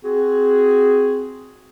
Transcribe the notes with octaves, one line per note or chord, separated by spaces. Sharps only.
C4 F#4 G#4